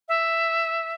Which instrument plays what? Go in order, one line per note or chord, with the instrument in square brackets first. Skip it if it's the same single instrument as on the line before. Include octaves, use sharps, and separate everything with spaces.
[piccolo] E5